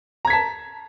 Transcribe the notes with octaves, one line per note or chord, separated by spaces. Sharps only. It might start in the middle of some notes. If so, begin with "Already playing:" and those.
A5 A#5 G#6 B6